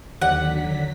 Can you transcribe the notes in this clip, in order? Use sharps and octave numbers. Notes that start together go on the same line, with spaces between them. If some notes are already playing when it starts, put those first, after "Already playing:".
D#2 D3 D#3 F#3 D5 F#5 B6